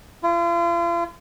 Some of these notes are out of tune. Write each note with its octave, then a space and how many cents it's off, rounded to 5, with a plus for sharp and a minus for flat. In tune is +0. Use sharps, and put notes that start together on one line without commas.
F4 -40